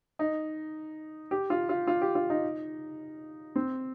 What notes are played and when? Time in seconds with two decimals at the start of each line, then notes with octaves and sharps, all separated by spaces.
0.19 D#4
1.31 G4
1.50 F4
1.69 F4
1.87 F4
2.01 G4
2.15 F4
2.30 D#4
3.56 C4